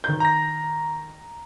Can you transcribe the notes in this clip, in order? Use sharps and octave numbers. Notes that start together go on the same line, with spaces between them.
D#3 G6
A#5 A#6